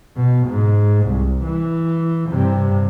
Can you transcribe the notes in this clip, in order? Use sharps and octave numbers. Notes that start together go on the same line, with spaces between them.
B2
G#2
C2
E3
G2 C3